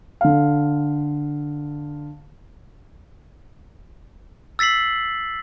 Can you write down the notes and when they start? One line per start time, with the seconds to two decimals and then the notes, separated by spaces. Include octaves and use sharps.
0.21 D3 F5
4.59 E6 A6 B6 C7 F#7